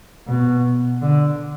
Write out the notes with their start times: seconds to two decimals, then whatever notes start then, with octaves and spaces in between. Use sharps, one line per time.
0.28 B2
1.02 D3